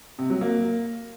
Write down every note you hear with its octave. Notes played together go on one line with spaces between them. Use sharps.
C3
F#3
A#3